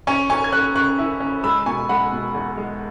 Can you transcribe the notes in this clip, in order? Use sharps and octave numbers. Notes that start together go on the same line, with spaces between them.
C#4 G#5 C#6
C#4 G#5 C#6
G#6
C#4 C#6 F#6
C#3 C#6 F#6
E4
C#4
G#3 B5 E6
B2 G#5 C#6
G#3 F#5 B5
B2
E2
G#3